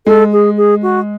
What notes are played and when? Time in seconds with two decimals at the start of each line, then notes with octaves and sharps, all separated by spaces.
0.06 G#3 A4
0.32 G#4
0.57 G#4
0.82 F#4